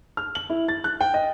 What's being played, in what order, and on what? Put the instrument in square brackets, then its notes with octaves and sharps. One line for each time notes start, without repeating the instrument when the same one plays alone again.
[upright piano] F6
F#7
E4
A6
F#6
G5
D#5